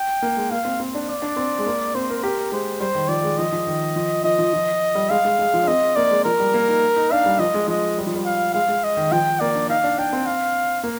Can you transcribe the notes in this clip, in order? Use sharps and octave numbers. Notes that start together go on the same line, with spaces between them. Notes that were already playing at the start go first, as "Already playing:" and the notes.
Already playing: G5
A#3
G#3
A#3 F5
C4
C4
D4
D5
D4
C4
G#3
A#3
C4 C5
A#4
G4 A#4
G#3 C5
G3 C5
D#3
F3 D5
G#3
F3 D#5
F3
D#3
F3
F3 D#5
F3
F3
G3
G#3 F5
G#3
G#3
F3
D4
C4 D#5
A#3 D5
G#3
F3 A#4
G3
A#3
D#4
D#4
D4 F5
G3
F3 D#5
G#3
F3 D#5
G3
F3
G3
F5
G#3 F5
G#3
D#5
D#3
F3 G5
A#3 D5
D4
D#4 F5
D4
D4 G5
C4
F5
A#3